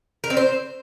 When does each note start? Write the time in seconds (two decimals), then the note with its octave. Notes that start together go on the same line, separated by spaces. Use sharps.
0.24 A#4
0.30 C4
0.37 C5